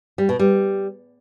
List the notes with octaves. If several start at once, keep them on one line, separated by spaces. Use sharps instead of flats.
G3
B2
G3